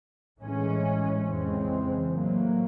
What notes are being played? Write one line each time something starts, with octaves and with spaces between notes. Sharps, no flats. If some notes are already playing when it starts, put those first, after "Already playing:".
A2 E3 G#3 C#4
F2 C#3 E3 G#3 C4
A2 F#3 A#3